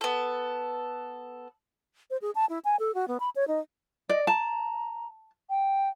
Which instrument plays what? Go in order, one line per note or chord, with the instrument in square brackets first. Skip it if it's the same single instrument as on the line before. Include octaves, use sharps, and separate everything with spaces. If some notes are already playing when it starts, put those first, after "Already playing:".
[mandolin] B3 A4
[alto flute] C5
G#4
A5
E4
G#5
A4
F#4
B3
B5
C#5
D#4
[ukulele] D5 [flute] D#5
[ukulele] A5 [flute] A#5
[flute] G5